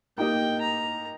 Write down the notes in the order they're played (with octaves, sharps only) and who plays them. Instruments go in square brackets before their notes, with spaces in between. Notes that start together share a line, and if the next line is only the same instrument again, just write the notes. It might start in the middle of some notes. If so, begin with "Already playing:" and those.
[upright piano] A#3 D#4 G4 D#5 [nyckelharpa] G5
[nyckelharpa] A#5